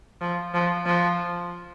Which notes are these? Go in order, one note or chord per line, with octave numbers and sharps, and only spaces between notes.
F3
F3
F3